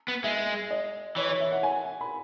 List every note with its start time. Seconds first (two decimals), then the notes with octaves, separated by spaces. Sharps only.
0.08 B3
0.24 G#3 E5
0.71 D#5
1.16 E3 C#5
1.29 C#5
1.40 E5
1.52 F#5
1.63 G#5
2.01 B5